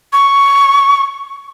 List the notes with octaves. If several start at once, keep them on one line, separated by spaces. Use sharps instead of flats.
C#6